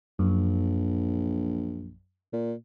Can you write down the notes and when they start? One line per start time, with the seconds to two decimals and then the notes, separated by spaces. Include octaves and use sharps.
0.19 A#1 F#2
2.33 A#2